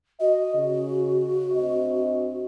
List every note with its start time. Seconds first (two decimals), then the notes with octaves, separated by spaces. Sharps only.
0.20 F#4 D#5
0.55 C#3
1.53 D2 C4 D#5